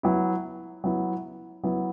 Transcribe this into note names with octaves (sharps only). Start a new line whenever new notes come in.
F#3 B3 E4
F#3 B3 E4
F#3 B3 E4